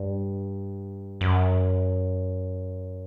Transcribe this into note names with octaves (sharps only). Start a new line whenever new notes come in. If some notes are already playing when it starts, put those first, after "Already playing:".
Already playing: G2
F#2